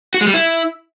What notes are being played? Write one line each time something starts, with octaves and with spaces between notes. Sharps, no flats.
F#4
G#3
G3
E4